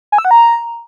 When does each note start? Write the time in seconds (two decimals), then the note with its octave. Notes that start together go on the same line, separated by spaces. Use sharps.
0.12 G#5
0.18 E6
0.25 F#5
0.31 A#5